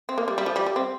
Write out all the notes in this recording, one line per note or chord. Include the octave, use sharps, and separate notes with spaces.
C4
A#3
G3
G3
F3
G3
G3
C4